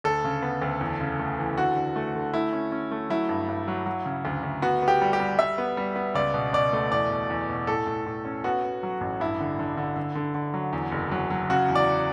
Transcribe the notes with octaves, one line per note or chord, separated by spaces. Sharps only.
D2 A4
C#3
B3
D2
E2
C#3
A3
E3
D3 F#4
D3
A3
D3
A3 E4
C#4
C#4
A3
F#3 E4
G2
G2
F#3
F#3
C#3
D2
D2
B3 F#4
B3
G4
G3
G4
G3
G3 E5
B3
G3
B3
C#2 D5
B2
B2 D5
A3
E2 D5
B2
E2
B2
A2 A4
A2
A2
C#4
B3 F#4
B3
F#3
A1
G2 E4
D3
D3
D3
D3
D3
D3
F#3
E2
F#1
F#3
F#3
C#3 F#4
E2
D5